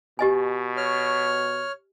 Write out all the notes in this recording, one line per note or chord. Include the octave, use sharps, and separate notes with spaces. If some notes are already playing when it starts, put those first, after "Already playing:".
B2 G4 D#5 G#5
C#5 F6